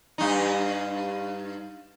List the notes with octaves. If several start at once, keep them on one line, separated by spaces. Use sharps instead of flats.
G2 D#4